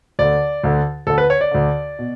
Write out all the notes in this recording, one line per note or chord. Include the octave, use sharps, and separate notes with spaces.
D2 D3 D5
D2 D3
D2 D3 A4
B4
C#5
D5
D2 D3
B2